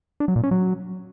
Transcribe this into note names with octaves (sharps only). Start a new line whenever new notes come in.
D4
F#3
A#2
C#4
F#3